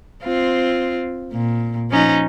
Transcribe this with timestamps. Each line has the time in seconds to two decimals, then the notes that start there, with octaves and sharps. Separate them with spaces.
0.23 C4 F4
1.33 A#2
1.90 F3 C#4 D#4